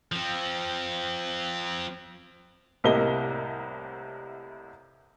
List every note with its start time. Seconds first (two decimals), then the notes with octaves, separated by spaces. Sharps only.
0.12 F3 C4
2.84 C2 A2 C3 A#3 D#5 G7